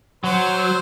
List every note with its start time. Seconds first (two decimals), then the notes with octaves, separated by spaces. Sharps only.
0.24 F#3 C5